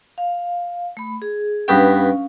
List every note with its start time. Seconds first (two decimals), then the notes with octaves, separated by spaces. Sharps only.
0.18 F5
0.97 A3 B5
1.22 G#4
1.68 G2 B3 C#4 F5 G5